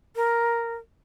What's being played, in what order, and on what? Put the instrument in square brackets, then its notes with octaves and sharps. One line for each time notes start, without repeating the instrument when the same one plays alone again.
[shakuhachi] A#4